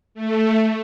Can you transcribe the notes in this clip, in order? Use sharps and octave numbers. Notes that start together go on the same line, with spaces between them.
A3